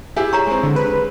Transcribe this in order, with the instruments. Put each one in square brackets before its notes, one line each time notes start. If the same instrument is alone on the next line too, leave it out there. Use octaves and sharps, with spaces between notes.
[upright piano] E4 G4 G#4
[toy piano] C#5 A#5 C#6
[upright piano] G#3 C4
[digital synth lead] D3
B4